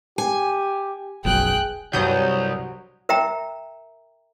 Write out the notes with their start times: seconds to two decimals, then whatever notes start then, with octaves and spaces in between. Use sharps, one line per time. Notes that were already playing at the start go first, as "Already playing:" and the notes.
0.18 G4 G#5
1.25 F1 B1 F#2 G#4 G5 F#6
1.93 C2 G2 F#3 C#5 D#6 G6
3.09 A#4 E5 G5 A#5